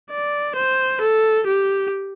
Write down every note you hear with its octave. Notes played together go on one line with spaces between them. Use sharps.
D5
C5
A4
G4